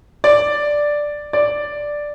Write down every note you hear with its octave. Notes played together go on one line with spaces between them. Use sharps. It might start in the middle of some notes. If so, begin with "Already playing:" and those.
D5
D5